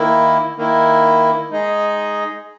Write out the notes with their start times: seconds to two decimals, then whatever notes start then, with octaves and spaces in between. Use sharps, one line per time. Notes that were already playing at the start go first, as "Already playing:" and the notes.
Already playing: D#3 A#3 E4
0.56 D#3 A#3 E4
1.50 G#3 D#4 G#4 D#5